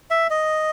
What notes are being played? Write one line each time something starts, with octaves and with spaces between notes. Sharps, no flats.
E5
D#5